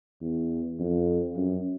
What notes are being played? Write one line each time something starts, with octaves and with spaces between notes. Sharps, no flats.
E2
F2
F#2